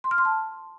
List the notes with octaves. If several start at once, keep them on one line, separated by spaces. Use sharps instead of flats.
C6
F6
C6
A5